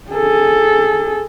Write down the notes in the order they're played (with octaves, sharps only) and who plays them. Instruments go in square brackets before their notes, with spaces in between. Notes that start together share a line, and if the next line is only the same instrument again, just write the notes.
[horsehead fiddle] G#4 A4